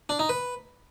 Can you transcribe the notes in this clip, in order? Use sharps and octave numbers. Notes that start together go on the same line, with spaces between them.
D4
D#4
B4